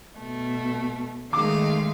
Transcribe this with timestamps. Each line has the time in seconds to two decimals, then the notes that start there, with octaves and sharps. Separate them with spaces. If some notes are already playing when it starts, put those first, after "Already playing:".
0.19 B2 A3
1.33 D#3 G#3 A3 F5 D6